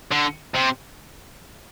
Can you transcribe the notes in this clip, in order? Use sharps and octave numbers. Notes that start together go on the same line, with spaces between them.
D3
C3